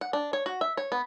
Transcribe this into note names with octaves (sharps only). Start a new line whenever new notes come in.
F#5
D4
C#5
F#4
E5
C#5
B3